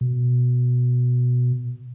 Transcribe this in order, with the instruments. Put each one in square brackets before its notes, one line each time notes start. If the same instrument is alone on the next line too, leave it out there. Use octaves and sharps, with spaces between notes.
[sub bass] B2